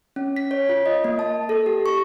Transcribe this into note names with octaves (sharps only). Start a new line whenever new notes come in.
C#4
B6
C#5
F4
D#5
A#3
A5
A4
G4
C#6